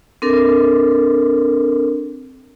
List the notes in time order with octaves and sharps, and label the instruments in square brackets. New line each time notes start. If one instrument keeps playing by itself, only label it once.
[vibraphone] C4 D4 A4 A#4